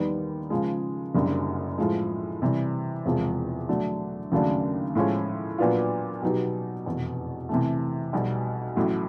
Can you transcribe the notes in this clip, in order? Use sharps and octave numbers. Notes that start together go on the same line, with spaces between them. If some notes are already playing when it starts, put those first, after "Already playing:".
Already playing: D#2 D#3 G3 B3 D#4
C#3 F3 G#3
F#1 F#2 D3 G3
A2 F3 G#3
C3 E3 G3
E1 E2 C3 F3 G#3
D3 F#3 A3 D4
D#2 C#3 F#3 A3 D4
A2 F3 G#3 C#4 F4
A#2 F#3 B3 D4 F4
B2 F#3 B3 D#4 G4
F1 E2 B2
C3 E3 A3
B1 B2 G3
A1 A2 F#3